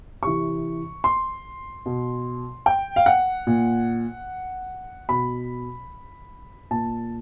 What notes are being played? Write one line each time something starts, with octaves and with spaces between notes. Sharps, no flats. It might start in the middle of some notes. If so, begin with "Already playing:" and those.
C3 E3 C#6
C6
B2
G5
F5
F#5
A#2
B2 B5
A#2 A5